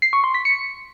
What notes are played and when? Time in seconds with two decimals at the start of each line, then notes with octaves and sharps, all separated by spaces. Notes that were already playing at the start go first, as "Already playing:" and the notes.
0.02 C7
0.13 C#6
0.24 C6
0.34 B6
0.45 C#7